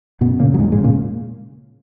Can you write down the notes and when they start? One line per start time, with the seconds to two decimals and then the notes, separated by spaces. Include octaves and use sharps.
0.21 F#2 B2 B3
0.39 A#2 C#3 A#3
0.54 F#3
0.58 E2 G#2 G#3
0.72 G#2 G#3
0.78 C#3
0.84 A#2 A#3